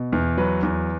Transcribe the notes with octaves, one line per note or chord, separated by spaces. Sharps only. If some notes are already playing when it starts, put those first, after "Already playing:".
Already playing: B2
E2
F#3 B4
E2